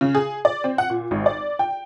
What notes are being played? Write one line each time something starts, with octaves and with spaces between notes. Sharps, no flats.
C#3
G#4
D5
C4
F#5
A#2
G#1
D5
G5